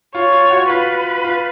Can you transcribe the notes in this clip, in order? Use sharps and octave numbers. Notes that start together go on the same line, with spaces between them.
F4 C#5
F4
F#4
F4 B4
F4